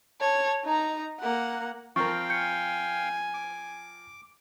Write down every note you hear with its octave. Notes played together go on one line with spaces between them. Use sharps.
C#5 A5
D#4 A#5
A#3 F#5
F3 C4 A#4 F5 G5 C#6
G#5 G6 C#7
D6